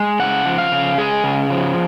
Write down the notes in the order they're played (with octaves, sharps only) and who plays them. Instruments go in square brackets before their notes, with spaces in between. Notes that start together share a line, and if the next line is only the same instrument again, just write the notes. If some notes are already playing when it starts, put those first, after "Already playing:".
Already playing: [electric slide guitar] G#3
C#3 F#5
F3
F5
C#3
G#3 G#4
C#3
F3